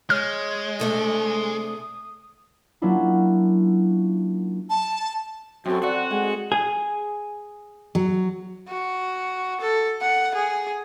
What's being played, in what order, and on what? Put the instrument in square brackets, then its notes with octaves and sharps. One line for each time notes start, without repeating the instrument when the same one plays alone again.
[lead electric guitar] G#3 [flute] C#5 [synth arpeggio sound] F6
[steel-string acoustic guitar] C3 A3 D4 [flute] D#6
[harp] F#3 A#3 C#4 D4 E4 F4
[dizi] A5
[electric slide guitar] F#2 [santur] C4 A4 [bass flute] F#4
[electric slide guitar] F#4 [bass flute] D5 [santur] F#5
[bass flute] G#3 [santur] G5 G#5
[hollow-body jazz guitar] G#4
[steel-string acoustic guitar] F#3
[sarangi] F#4
A4
F#5
G#4